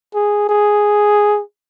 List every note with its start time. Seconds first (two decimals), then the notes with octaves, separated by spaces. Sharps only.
0.14 G#4
0.49 G#4